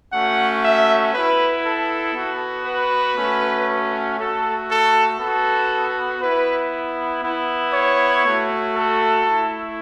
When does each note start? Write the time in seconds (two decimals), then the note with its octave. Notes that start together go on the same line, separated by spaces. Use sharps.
0.11 A3 C#4 F#4 F#5
0.62 E5
1.13 B3 E4 B4
1.64 A4
2.15 B3 F#4
2.65 B4
3.17 A3 C#4 F#4
4.18 A3 F#4 A4
4.69 A4
5.19 B3 F#4 A4
6.20 B3 E4 B4
7.22 B3 E4
7.73 C#5
8.24 A3 F#4
8.74 A4
9.25 A3 E4